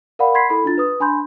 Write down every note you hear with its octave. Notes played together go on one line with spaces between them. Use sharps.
A#4 D5 F5 F#5 B5
B5 C6 G#6 B6 C7
E4 A4 B5
D4 F4 A6
B4 D#6
D4 G#5 B5 C6 G6